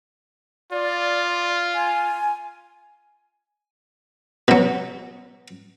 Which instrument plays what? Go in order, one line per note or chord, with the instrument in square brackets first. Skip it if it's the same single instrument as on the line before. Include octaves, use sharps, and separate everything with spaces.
[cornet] F4 [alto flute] D5
[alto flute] G#5
[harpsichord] B2 F#3